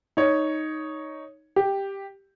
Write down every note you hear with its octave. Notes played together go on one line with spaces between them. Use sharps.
D#4 C#5
G4